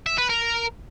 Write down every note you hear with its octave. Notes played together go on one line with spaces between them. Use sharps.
E5
B4
A#4